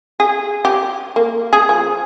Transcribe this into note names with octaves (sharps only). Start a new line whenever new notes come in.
G#4
G4
A#3
G#4
F3